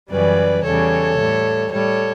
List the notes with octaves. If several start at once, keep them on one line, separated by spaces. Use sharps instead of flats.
F#2 C#3 E3 G3 B4 D5
E2 C#3 E3 G3 A4 C#5
A2 G3
A2 G3 A4 C#5